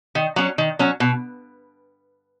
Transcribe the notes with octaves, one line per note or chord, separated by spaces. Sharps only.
D#3
F#3 C#4
D#3
F#3 C#4
B2